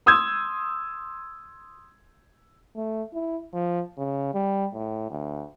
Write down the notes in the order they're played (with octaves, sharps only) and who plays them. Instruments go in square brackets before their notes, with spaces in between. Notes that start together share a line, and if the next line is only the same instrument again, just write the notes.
[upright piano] C6 D#6 E6 G6 G#6
[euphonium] A3
E4
F3
C#3
G3
A2
D2